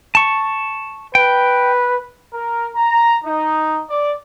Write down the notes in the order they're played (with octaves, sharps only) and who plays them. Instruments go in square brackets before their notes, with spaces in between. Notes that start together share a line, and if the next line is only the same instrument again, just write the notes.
[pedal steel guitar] A5 C#6
[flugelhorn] B4 [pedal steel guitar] G5
[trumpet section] A#4
A#5
D#4
D5